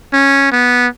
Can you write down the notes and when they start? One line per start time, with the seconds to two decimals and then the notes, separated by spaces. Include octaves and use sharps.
0.13 C#4
0.52 B3